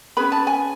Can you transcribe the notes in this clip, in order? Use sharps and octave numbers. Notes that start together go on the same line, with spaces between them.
C#4 G#4 B4 B5
A5
G#5